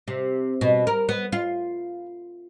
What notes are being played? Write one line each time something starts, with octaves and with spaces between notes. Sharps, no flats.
C3
B2
A#4
B3
F4